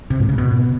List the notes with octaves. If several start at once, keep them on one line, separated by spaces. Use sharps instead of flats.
C3
G#2
C#3
B2